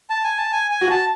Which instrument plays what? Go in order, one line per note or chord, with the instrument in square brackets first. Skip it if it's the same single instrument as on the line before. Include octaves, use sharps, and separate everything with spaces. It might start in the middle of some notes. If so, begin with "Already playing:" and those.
[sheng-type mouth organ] A5
G#5
A5
G#5
G#5
[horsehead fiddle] F#4
[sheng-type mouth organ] A5